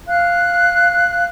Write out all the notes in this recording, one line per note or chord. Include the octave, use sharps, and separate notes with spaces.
F5 F#6